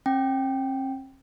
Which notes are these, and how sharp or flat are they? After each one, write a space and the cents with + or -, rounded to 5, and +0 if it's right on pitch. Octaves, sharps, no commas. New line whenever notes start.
C4 +45 G5 +0